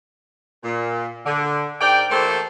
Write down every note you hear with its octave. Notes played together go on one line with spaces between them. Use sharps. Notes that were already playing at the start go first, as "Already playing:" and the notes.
A#2
D3
G#2 A#4 D5 G5
E3 A3 A#3 G4 A4 C5